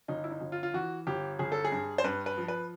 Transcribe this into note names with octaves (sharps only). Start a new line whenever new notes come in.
G1 D#4
E4
D#4
G1
F4
F4
E3 F#4
G1 G4
G1 G#4
A4
G#4
G2
C5
G2 B4
B4
F3
B4